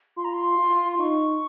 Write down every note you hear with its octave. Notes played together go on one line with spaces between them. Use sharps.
F4 C6
A#5
C6
F4
C6
D#4 C#6